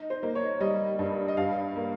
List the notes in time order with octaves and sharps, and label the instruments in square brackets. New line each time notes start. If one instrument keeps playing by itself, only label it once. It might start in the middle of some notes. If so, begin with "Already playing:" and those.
Already playing: [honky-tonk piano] D#4
[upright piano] C5
[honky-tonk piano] A#3
[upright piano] C#5
[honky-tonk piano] G3 [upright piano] D#5
[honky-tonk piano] G2
[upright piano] D#5
[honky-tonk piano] G2 [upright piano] F5
[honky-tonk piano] A#3